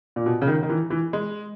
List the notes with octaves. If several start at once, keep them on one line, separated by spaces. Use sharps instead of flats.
A#2
B2
C#3
D#3
D#3
E3
E3
G#3